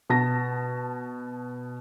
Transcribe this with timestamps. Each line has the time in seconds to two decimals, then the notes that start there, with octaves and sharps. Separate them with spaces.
0.10 B2 A5 A#6